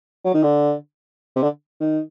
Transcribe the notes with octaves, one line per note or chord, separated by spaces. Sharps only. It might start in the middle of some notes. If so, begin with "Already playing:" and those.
F#3
D#3
D3
C3
D3
D#3